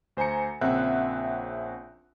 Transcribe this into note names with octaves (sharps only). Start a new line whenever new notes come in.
D2 C5 G#5 A#5 C#7
A#1 C#3 C4 E5 F#5 F#6